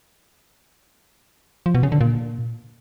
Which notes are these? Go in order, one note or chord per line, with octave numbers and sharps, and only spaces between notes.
F3
B2
C#3
D3
A#2